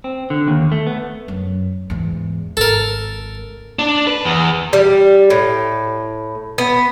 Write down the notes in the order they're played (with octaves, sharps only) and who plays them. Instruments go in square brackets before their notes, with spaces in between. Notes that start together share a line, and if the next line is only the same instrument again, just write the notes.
[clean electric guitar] C4
D3
D#2
A3
B3
[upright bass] F#2
E2 G#2
[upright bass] G#1 [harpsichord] A4 A#4
[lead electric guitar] D4
B4
E2
[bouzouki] G3
A2
B3